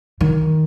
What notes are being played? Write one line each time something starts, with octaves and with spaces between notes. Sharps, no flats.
D#3